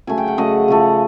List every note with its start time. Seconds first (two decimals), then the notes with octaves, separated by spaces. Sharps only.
0.07 C#3 F#3 A3 G#5
0.18 G5
0.28 F#5
0.38 C#3 F#3 A3 D#5
0.68 C#3 F3 A3